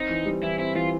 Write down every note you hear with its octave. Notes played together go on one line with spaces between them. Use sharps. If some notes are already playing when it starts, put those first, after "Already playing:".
Already playing: C4 D#4
E3
G3
E3 E4
C4 E4
E3 F4